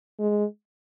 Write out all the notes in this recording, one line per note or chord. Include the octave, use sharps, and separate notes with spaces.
G#3